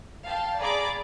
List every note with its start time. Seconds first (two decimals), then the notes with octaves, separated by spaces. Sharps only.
0.25 F5 G5 A5
0.59 G#4 D5 A#5 B5 D6